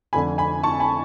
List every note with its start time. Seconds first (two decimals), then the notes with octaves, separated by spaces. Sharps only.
0.13 F1 F2 D3 G#5 B5
0.38 G#5 B5
0.63 A5 C#6
0.80 G#5 B5